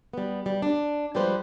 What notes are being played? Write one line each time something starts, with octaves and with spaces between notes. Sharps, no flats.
G3 B3
G3
D4
F3 G3 G#3 G4 B4 C5